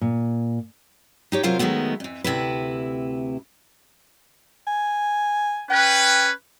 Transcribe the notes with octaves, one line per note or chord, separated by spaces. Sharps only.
A#2
D#4 G4 C#5
C3 F#3 F4 A#4 C5 F5
D#3 F#3 G#3 A3 B3
F2 E3
D2 C3 E4 B4
G#5
C#4 B4 G5